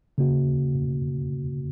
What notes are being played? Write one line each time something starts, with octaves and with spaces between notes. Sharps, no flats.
C#3 A#3 F#4